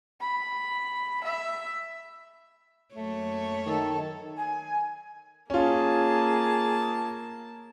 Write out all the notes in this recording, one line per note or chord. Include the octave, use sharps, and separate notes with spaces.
B5
E5
F#2 A3 A#3 C#5
D#3 A4
G#5
A#3 C#4 F4 G#4 A5